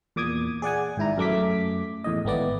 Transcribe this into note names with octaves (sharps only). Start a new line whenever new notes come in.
E2 A#2 D6 D#6 G#6
G#4 D5 F#5 G#5
G#1 G#2 E4 A#5
F#2 A3 D6 B6
E2 A2 D#5
G#1 A3 B3 D5